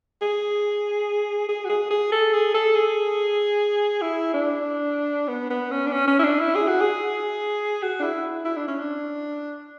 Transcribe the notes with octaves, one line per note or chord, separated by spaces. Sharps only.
G#4
G#4
F#4
G#4
G#4
A4
G#4
A4
G#4
E4
D4
B3
B3
C#4
D4
C#4
C#4
E4
D4
E4
G#4
F#4
G#4
F#4
D4
E4
E4
D4
C#4
D4